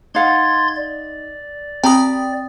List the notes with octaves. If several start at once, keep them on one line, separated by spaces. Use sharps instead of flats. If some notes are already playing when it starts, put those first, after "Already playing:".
D#4 F5 F#5 C6 G#6 A6
D5
C4 G4 G5 A#5 B5 D#6